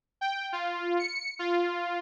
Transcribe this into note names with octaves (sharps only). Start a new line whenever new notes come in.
G5
F4
C#7
F4